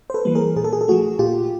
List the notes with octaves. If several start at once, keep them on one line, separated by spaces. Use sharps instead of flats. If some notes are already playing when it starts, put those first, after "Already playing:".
C5
A4 B4
E3 G3 A#3
G#4 A#4
A#2 G#4
A4
G#4
A4
F3 A3 F#4 G#4
A#2 F4 G4